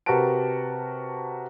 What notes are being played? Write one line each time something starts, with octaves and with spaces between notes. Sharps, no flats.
C3 F#4 A#4 B4 A5 D7